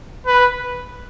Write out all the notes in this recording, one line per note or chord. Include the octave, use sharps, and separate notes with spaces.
B4